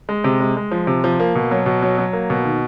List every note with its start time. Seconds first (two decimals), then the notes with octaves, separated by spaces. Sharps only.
0.09 G#3
0.24 C3
0.40 G#3
0.57 G#3
0.71 F3
0.87 C3
1.04 F3
1.20 A#3
1.35 B2
1.51 F#3
1.66 B2
1.82 F#3
1.98 F#3
2.13 A#3
2.30 B2
2.45 D#3